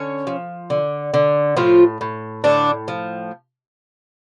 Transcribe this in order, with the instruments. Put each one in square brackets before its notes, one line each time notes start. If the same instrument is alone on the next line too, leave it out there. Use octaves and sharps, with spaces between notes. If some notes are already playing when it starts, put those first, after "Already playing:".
Already playing: [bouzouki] D3 C#4 C#5
F3
D3
D3
A2 F3 F4
A2
A2 D3 D4
F3